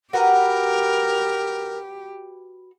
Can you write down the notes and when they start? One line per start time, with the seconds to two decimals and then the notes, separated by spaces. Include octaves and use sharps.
0.13 F#4 G4 A#4 B4 A#5